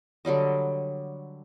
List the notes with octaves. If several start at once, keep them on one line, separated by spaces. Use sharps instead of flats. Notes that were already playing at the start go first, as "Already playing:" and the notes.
D3 F#3 G3 D#5